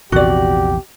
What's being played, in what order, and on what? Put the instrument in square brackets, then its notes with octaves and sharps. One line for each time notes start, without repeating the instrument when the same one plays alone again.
[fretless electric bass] A#1 E2 C3 [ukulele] F#4 D5 [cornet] G4